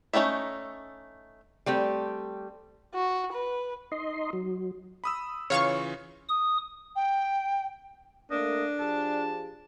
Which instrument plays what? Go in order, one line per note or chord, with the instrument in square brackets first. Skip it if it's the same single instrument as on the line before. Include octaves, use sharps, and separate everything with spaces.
[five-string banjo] A3 C#4 D#4 D5 E5
[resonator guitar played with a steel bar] G3 A3 C4 G4
[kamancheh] F#4
B4
[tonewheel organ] D#4 D#5 C6
F#3
[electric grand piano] B5 D#6 E6
[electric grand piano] C#3 E3 F4 [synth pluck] C#5 F5 C#6
[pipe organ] D#6
[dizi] G5
[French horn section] A3 A#3 [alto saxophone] D4 [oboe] D#5
[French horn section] F3 G4 G#4 [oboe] A5